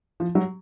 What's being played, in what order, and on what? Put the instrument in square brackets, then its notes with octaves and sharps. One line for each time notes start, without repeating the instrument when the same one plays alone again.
[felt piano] F3
F#3